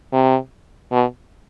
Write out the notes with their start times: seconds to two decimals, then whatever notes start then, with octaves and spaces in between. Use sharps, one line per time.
0.13 C3
0.92 B2